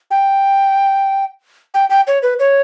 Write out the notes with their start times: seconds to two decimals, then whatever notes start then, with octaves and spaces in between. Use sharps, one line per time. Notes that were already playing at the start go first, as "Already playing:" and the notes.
0.11 G5
1.74 G5
1.90 G5
2.07 C#5
2.23 B4
2.39 C#5